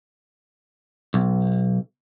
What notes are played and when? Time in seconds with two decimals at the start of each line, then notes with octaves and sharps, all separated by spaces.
1.14 B1